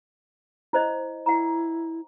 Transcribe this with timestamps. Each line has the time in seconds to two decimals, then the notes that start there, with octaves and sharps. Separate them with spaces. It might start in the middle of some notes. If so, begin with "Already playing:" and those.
0.73 E4 C5 D#5
1.26 E4 F#5 A#5